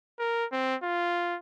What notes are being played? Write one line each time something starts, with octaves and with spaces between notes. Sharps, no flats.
A#4
C4
F4